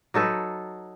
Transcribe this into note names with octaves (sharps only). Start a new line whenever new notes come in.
F#3 D#4 A4 B4